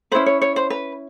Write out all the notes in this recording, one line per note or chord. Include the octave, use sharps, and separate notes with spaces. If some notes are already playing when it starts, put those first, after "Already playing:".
C#4 E4 G#4 B4 C5
C#5
C#5
C5
B4